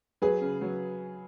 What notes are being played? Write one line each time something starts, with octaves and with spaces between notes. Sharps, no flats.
F#3 G#4 B4
C#3
F#3